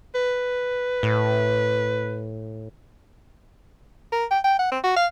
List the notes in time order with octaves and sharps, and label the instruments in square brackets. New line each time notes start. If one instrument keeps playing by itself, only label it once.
[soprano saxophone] B4
[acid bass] A2
[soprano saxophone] A#4
G5
G5
F#5
C4
F#4
F5